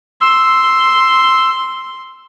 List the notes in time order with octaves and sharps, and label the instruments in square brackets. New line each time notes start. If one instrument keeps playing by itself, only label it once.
[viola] C6 [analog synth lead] E6